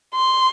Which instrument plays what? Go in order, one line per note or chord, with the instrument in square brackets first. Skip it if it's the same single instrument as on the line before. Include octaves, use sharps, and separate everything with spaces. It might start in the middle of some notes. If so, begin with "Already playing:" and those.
[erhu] C6